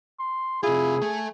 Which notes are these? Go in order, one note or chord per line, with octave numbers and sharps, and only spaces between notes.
C6
C3 E4 F4 G#4
A3 A4 G#5